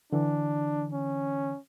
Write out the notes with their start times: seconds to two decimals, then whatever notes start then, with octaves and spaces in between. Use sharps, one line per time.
0.12 D3 E3 D4
0.92 C#4